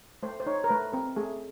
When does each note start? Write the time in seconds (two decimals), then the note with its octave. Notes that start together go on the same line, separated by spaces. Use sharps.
0.23 A3 C5
0.40 C5
0.46 D#4 C#5
0.64 A#4
0.70 A3 B4
0.93 C4 A#4
1.16 A3 G#4